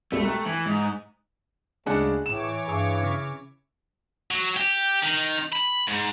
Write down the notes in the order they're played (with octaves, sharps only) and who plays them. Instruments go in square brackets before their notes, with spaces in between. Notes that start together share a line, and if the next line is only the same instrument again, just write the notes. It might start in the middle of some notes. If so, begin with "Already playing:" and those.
[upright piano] E1 C2 B2 [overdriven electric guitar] A3
[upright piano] G5 A#5 F#6
[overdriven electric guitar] E3 [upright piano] F#7
[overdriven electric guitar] G#2 D#4
[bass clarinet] D2 [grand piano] C#3 G#3 D4 [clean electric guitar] G#4 F#5
[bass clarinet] A2 [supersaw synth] E3 C#5 D6 [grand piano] E7
[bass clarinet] G2 [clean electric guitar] G#4
[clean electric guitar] C#3
[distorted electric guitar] F#3
G4
D#3
B5
G#2